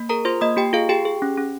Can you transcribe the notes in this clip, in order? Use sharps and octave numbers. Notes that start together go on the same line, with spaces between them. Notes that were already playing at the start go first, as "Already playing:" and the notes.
Already playing: A#3
G#4 A#4 A#5
F4 C5 C6
A#3 D#5 D#6
A#3 G4 G5
F4 G#4 F5
G4 G#4 G5
G#4
C#4
C#4